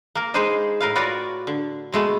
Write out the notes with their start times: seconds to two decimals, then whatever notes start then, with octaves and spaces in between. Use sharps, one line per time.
0.15 A#3 A#4
0.34 G#3 D#4 G#4 B4 C5 D#5
0.80 A2 A#4 B4 F5
0.95 F4 F#4 B4 C#5 D5
1.47 D3
1.92 B2 G#3 A3 B3